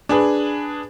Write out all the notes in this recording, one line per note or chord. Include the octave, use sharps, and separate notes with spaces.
D4 G#4 B4